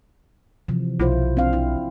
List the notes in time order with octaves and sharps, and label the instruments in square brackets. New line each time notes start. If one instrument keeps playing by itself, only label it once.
[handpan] C3 E3 F3
[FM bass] B1 [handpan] E4 F4 C5
[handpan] C4 D4 F5
E4